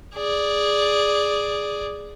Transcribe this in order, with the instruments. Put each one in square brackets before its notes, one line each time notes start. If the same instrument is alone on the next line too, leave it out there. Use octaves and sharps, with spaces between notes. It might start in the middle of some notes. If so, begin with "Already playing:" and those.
[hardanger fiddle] G#4 D5